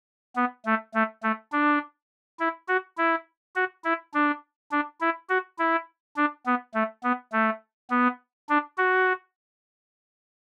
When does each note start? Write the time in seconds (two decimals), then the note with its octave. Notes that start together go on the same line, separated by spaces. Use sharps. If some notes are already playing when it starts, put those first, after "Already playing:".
0.36 B3
0.65 A3
0.94 A3
1.23 A3
1.52 D4
2.39 E4
2.68 F#4
2.98 E4
3.56 F#4
3.84 E4
4.14 D4
4.71 D4
5.01 E4
5.29 F#4
5.58 E4
6.16 D4
6.46 B3
6.74 A3
7.03 B3
7.32 A3
7.90 B3
8.49 D4
8.78 F#4